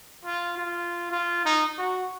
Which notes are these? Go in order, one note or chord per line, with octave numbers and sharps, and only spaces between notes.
F4
F4
F4
D#4
F#4